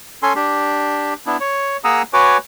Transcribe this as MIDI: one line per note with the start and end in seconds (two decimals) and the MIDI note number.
0.23 0.33 61
0.23 0.33 69
0.23 0.33 80
0.23 0.33 84
0.36 1.14 62
0.36 1.14 67
1.26 1.37 59
1.26 1.37 62
1.26 1.37 64
1.40 1.77 73
1.84 2.02 58
1.84 2.02 68
1.84 2.02 78
1.84 2.02 82
1.84 2.02 87
1.84 2.02 88
2.13 2.37 66
2.13 2.37 71
2.13 2.37 73
2.13 2.37 80
2.13 2.37 86